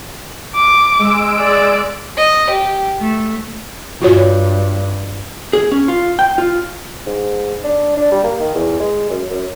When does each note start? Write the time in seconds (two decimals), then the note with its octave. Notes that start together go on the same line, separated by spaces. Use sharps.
0.55 D6
0.99 G#3 E6 D7
1.39 D5
2.18 D#5
2.51 G4
3.01 A3
4.02 G2 F4 F#4 C#5
5.53 G#4
5.72 C#4
5.88 F4
6.19 G5
6.38 F4
7.06 G#2
7.64 D4
7.97 D4
8.12 G3
8.24 A#3
8.40 D#3
8.55 E2
8.80 G#3
9.10 F#2
9.30 F#2